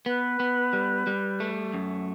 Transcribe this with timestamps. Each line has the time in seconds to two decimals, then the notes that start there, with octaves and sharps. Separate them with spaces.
0.06 B3 B4
0.40 B3
0.73 G3
1.07 G3
1.40 A3
1.74 F#2